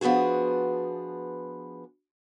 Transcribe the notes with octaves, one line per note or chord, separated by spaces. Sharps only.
F3 B3 D4 F#4 G#4